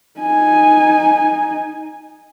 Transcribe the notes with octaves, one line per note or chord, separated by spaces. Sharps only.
D#4 G#5